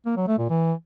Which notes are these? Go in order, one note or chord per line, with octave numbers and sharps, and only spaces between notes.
A#3
F#3
A3
A#2
E3